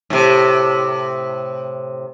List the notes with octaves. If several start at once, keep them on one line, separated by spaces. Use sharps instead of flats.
A2 C3